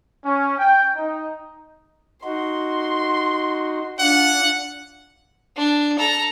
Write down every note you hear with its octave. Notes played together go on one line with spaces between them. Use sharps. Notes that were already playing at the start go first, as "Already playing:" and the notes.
C#4
G5
D#4
D#4 F#4 C6
D4 F4 F#5
D4
A4 A#5